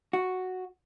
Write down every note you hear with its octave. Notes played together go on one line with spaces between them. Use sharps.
F#4